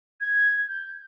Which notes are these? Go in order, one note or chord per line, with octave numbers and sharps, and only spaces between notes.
G#6
G6